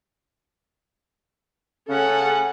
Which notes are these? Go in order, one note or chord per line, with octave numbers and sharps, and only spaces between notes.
C#3 C#4 A4 F#5